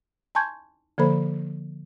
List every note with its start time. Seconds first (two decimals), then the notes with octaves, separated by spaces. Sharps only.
0.35 G#5 A5 C6 C#6 G6 G#6
0.98 D3 F3 A#3 A4 C5 B5